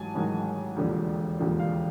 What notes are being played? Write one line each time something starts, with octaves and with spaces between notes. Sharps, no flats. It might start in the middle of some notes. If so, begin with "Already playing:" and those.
Already playing: A1 G#2 F#3 G#5 A5
A1 G#2 D#3 F#3
E1 D#2 D3 F3
E1 D#2 D3 F3
F5